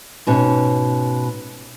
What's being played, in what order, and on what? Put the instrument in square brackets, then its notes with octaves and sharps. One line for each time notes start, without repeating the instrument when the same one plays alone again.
[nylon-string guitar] G#2 B2 C#4